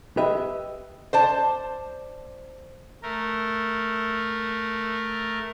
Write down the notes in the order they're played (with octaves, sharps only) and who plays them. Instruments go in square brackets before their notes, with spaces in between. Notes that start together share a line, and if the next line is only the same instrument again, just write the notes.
[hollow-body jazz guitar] G4 B4 D#5 E5
[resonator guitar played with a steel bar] C5 D5 A5
[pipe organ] A3 A#4